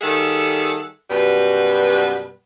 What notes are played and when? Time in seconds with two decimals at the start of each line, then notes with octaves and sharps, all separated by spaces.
0.01 D#3 G3 G#4 A4 E5 F#5
1.10 F#2 B2 G3 B3 B4